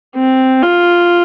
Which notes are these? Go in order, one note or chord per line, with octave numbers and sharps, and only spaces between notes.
C4
F4